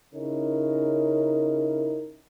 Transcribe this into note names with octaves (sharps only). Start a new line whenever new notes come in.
C#3 C#4 D#4 E4 A#4